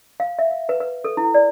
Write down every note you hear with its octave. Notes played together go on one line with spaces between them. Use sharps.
F5
E5
F5
B4
B4
A4
E4
D5